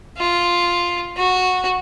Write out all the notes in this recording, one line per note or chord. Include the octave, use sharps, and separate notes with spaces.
F4
F#4